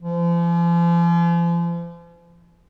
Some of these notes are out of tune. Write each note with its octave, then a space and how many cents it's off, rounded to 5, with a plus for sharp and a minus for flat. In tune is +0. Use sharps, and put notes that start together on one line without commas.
F3 -40